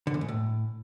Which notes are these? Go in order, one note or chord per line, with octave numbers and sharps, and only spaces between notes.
D3
E2
G#2
A2